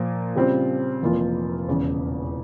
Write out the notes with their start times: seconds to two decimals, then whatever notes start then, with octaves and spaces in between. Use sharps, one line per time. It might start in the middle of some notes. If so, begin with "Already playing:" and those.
Already playing: A#2 F3 A#3
0.35 C#3 G3 C4 F4 C5
1.02 F1 F2 E3 A#3 F4
1.68 E1 E2 C#3